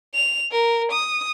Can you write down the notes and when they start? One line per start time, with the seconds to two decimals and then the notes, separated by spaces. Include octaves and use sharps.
0.14 F7
0.52 A#4
0.92 D#6